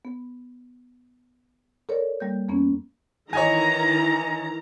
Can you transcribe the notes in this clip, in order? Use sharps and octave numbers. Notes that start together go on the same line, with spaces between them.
B3
A4 A#4 C#5 D5
G3 A#3 G6
F2 A#3 B3 C#4
D#3 E3 C#5 D#5 G#5 A#5